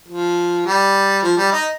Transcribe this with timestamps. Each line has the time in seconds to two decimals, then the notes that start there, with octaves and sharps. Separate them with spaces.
0.08 F3
0.66 G3
1.23 F3
1.38 G3
1.52 D#4